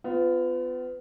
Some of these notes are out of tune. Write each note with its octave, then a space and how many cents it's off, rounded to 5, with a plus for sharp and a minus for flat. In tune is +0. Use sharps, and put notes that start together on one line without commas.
B3 +35 F4 +0